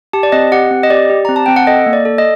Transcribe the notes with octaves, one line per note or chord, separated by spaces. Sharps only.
G4 A5
D5
C4 D#5
G4 F#5
C4
D#5
G4 D5
G4
C4 A#5
A5
C4 G5
F#5
A4 D#5
A#3
D5
A4
D#5